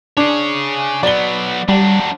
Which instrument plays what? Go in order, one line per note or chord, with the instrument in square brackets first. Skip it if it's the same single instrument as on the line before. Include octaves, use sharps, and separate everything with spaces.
[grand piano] D4 [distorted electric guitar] G#4 C#5
[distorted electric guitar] F#3 B3 [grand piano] D5 G7
[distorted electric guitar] F#3 D4 [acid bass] G3